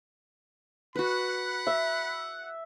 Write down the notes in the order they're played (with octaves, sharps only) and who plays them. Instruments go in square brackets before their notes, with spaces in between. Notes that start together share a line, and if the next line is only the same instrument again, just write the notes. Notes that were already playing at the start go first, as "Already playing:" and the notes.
[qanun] F#4 B4 [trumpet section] F#5 [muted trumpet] B5
[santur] E5